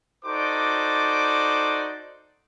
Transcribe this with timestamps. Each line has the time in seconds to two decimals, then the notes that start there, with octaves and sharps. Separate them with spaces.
0.25 D#4 F#4 A4 C5 D5 D6